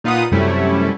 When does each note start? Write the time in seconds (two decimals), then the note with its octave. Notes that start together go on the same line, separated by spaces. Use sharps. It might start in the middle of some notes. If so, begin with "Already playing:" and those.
0.04 A#2 D#4 F4 B4 F#5 D#6
0.32 F#2 C3 G3 A3 C#4 E4